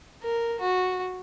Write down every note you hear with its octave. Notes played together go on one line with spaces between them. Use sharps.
A#4
F#4